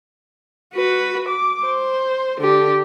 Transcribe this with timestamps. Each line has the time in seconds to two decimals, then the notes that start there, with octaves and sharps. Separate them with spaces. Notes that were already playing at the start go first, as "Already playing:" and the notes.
0.74 F#4 B4
1.29 D6
1.65 C5
2.41 D3 G4